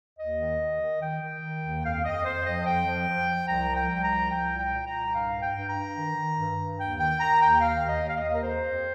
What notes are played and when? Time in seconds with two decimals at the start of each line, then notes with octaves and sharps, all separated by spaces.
0.18 D#2 D#5
0.38 D#3
0.59 D#3
0.80 D#3
1.00 D#3 G5
1.21 D#3
1.42 D#3
1.62 D#2
1.83 F2 F5
2.04 F2 D#5
2.24 F2 C5
2.44 F3 D#5
2.65 F2 G5
2.86 F3
3.07 F3
3.28 F3
3.47 C2 A#5
3.68 F3
3.75 G5
3.90 C2
4.03 A#5
4.10 F3
4.30 C2 G5
4.51 A#2
4.58 G5
4.72 A#2
4.85 A#5
4.93 C2
5.12 G2 F5
5.33 G2
5.41 G5
5.54 G2
5.68 A#5
5.74 G2
5.96 D#3
6.16 D#3
6.37 G2
6.57 G2
6.77 D#2 G5
6.98 D#3 G5
7.19 D#3 A#5
7.40 D#2 G5
7.61 D#3 F5
7.81 D#2
7.87 D#5
8.01 D#2
8.08 F5
8.16 D#5
8.22 D#2
8.35 A#4
8.42 F2 C5
8.63 F2